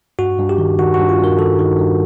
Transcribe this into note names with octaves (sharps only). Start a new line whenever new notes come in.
G2 F#4
G2
G4
D#3
D#3 F#4
G2 F#4
F4
G2 A#4
D#3 A4
D#3
G2